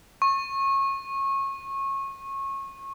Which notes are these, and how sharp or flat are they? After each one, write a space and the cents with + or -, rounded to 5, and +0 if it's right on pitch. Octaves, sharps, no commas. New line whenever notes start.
C#6 -25